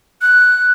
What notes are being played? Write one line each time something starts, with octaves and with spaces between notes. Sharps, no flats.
F#6